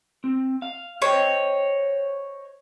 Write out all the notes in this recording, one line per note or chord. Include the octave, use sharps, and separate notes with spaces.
C4
F5
C5 C#5 D#5 G5